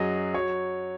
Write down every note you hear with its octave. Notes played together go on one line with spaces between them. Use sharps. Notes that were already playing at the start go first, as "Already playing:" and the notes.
Already playing: F#2 F#3 G#4 D#5
F#3 C#5